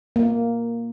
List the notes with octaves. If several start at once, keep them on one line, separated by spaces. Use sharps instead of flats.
A#3